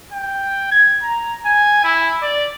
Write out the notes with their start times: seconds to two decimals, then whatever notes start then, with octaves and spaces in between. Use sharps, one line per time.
0.12 G5
0.71 G#6
1.03 A#5
1.46 G#5
1.84 E4
2.21 D5